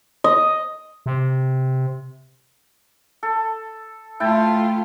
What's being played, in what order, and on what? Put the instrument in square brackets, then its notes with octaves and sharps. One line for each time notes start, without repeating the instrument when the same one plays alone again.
[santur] D#5
[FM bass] C3
[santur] A4
[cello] A3 F4 [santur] E4 G5 A5